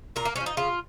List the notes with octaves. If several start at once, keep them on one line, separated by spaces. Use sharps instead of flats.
A#2 A#4
A#3
F3 G#3 C#4
D#4
C#3 F4